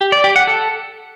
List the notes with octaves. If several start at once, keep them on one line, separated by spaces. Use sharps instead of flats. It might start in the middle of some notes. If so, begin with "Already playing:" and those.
G4
D5
G4
F#5
A4